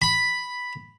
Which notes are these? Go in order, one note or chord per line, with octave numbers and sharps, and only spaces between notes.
B5